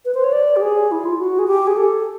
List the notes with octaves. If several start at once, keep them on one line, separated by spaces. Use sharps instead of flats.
B4
C5
C#5
D5
G4
G#4
E4
F4
F#4
G#4
G4
G#4
A4